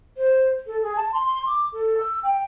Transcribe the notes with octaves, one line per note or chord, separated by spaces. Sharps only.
C5
A4
G#4
A5
C6
D6
A4
E6
G5